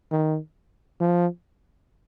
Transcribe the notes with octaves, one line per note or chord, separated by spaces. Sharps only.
D#3
F3